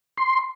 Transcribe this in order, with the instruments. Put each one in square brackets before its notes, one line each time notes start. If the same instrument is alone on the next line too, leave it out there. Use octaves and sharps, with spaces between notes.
[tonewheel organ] C6